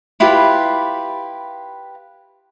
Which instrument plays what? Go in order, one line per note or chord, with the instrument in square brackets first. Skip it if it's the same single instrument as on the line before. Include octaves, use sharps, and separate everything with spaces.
[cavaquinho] E4 F4 G4 B4